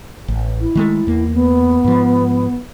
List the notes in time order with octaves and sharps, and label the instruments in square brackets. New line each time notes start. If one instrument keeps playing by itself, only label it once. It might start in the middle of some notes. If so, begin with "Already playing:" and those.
[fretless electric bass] A1
[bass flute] E4
[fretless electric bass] D#3 G#3 A3
E2 A#3
[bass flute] B3
[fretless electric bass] G#2 F3